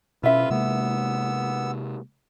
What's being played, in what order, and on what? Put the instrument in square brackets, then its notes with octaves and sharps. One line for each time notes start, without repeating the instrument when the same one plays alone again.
[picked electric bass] B2 C#4 [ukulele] E4 E5 [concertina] F4 B4
[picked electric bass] C3 G#3 A#3 [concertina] B3 E6